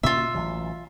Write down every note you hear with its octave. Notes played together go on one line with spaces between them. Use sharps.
B2 A#3 C#4 F4 E5
A1 E3 F#3